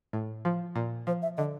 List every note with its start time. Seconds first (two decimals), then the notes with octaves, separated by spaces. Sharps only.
0.13 A2
0.45 F3
0.76 A#2
1.07 F3 C5
1.22 E5
1.37 D3 D#5